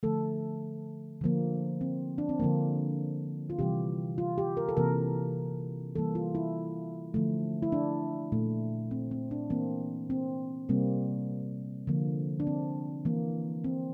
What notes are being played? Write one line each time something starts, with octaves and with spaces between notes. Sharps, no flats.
D3 F3 A3 A4
D3 F3 A#3
C4
D4
C4
D3 F3 A#3
F4
C3 E3 G3 G4
F4
G4
A#4
A4
C3 E3 A#3 A#4
E3 G3 A#3 A4
F4
E4
D3 F3 A3
E4
D4
A#2 A3
C4
C4
D4
E3 A#3 C4
C4
C3 G3 A#3 C4
D3 F3 A#3
D4
C4
E3 A#3
C4